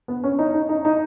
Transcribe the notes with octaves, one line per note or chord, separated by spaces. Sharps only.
B3
C#4
D#4
D#4
D#4
D#4